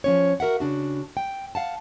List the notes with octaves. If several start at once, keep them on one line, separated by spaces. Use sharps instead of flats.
F3 C#4 C#5
F#4 A#4 E5 F#5
C#3 D4 F#4
G5
F5 F#5 A5